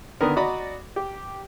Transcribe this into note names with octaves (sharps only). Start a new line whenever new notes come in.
D3 D#3 B3 A#4
F#4 D5 D#5 A#5 B5 D6
G4